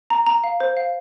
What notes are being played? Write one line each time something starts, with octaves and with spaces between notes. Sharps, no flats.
A#5
A#5
F5
C5
F5